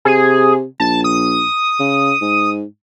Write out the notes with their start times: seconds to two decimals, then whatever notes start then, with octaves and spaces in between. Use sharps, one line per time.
0.05 C3 G#4
0.80 A#1 A5
1.04 D#6
1.79 C#3
2.21 G#2